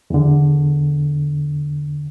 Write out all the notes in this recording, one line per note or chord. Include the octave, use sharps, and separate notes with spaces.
E2 D3